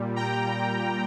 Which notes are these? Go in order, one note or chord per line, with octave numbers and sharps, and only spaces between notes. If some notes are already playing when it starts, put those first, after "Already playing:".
Already playing: A#2 G3
G5 A#5